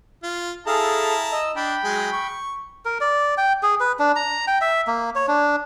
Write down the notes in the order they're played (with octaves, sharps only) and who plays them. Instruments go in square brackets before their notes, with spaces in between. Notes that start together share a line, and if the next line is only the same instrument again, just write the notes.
[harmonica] F4
[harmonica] E4 A5 A#5 [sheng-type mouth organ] G#4 A4 F5
[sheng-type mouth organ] D#5 E6
[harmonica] D4 [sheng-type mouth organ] G5 B5
[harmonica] F#3 G#3 G#4
C#6
[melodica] A#4
D5
G5
G#4
B4
D4
A#5
G5
E5
A#3
C#5
D4